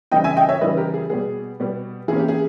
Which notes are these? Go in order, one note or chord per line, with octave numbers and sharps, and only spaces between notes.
C#3 E3 G3 D#5 G5
E5 G#5
D#5 G5
C#5 E5
C#3 E3 G3 B4 D#5
G4 A#4
G#4
B2 G3 B3 G#4
B2 G3 B3
E3 A#3 C#4 G#4
G4
G#4